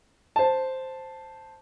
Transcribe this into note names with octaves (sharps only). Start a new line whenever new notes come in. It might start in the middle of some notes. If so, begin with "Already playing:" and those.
C5 A5